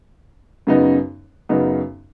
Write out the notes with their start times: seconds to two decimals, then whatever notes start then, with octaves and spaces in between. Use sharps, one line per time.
0.67 F#2 C#3 B3 D#4
1.49 F#2 C#3 B3 D#4